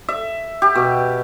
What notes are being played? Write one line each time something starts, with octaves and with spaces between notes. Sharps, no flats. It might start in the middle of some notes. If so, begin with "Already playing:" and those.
E5
G4
B2